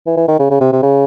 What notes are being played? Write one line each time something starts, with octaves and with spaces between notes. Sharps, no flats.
E3
E3
D#3
C#3
C#3
C3
C3
C#3